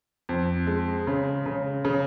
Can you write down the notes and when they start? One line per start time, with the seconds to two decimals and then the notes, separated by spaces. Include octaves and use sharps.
0.29 F2
0.67 G#3
1.07 C#3
1.46 C#3
1.85 C#3